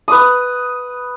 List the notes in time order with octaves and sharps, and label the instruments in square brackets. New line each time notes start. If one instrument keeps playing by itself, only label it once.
[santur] B4 D#6